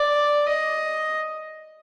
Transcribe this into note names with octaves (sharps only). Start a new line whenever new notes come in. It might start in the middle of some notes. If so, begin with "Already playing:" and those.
Already playing: D5
D#5